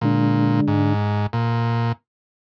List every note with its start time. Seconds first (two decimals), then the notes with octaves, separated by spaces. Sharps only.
0.01 A#2 D3 G#3 D4
0.67 G#2
1.33 A#2